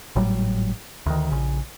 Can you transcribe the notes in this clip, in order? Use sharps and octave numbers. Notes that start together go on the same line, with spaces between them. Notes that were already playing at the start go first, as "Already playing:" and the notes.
G#1 A2 F#3 G3
D2 D#3
A#1 C#3